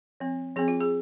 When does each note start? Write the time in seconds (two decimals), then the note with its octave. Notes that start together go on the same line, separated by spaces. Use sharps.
0.20 F3 C4
0.56 F3 C4 G#4
0.68 F4
0.80 G#4